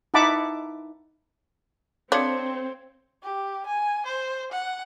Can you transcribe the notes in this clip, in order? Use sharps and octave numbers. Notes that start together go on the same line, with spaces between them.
D#4 E4 F#5 A5 B5 D6
C4 D4 A4 C#5 F5 C6 G#6 C#7
G4
G#5
C5
F#5